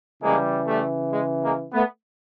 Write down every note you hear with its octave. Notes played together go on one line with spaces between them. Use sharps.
C#3 E3 G3 G#3 A#3
G3 A3
G#3
G#3 A#3
A3 B3